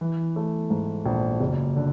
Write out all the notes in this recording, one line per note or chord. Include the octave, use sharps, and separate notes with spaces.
E3
A3
G#2
A#1
F#1
D3